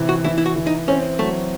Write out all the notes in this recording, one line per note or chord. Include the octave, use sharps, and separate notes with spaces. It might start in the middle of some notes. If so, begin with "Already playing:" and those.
Already playing: C3 E3
F#4
E3 E4
E4
F#4
E3
D#4
C4 C#4
F#3 A3